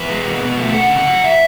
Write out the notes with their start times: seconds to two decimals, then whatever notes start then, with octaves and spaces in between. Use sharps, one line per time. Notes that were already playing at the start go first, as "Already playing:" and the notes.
Already playing: E2 B4
0.09 G#3
0.26 B2
0.41 B2
0.57 A3
0.74 C#4 F#5
0.90 C#3
0.98 F#5
1.06 F#3
1.24 E5